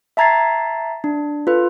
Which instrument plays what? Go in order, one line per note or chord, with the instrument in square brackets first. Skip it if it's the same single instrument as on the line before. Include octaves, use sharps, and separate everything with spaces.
[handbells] E5 A5 A#5 G#6 A6 C7
D4
F4 A4 B4